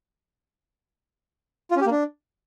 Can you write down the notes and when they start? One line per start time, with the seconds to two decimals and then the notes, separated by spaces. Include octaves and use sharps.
1.71 F4
1.76 C#4
1.81 G4
1.86 A#3
1.91 D4